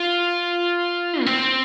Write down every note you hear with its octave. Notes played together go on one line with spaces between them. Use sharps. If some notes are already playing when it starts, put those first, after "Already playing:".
Already playing: F4
A#3
C4